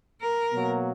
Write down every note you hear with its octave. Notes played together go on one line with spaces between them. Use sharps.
A#4
B2 F#3 A#3